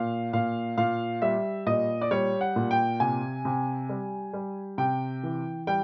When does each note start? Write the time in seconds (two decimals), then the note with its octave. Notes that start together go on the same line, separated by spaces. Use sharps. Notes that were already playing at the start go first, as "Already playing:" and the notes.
Already playing: A#2 F5
0.33 A#2 F5
0.78 A#2 F5
1.22 G3 E5
1.66 A#2 D#5
2.01 D5
2.11 G3 C#5
2.41 F#5
2.56 A#2
2.71 G5
3.00 C3 G#5
3.45 C3
3.89 G3
4.34 G3
4.78 C3 G5
5.23 E3
5.67 G3 G5